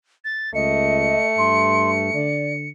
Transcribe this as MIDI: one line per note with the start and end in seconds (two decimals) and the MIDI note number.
0.25 0.53 93
0.54 1.18 37
0.54 2.30 57
0.54 1.26 75
0.54 2.69 97
1.38 2.13 43
1.38 1.90 84
2.14 2.70 50
2.14 2.53 74